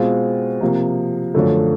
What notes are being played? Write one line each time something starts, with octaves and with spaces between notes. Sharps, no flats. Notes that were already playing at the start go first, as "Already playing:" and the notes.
Already playing: B2 G#3 C4 F4
C3 F3 A#3
F#2 D3 F3 A3